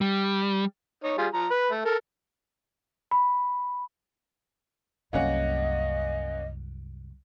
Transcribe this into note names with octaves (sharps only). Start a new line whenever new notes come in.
G3
D#4 C#5
G3 F4 G#4
F3 A#5
B4
A3
A4 A#4
B5
C2 F#2 A#3 C#4 D#5 F#5